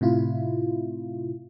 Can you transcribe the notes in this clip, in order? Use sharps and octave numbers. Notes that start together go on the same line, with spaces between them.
A2 C3 E4 F4